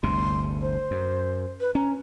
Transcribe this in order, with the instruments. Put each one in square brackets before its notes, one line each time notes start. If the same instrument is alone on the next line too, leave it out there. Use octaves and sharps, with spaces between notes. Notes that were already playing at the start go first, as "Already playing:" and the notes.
[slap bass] G1 D2 C3 [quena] C6
[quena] C5
[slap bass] F#2
[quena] B4
[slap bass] C#4 [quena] A#5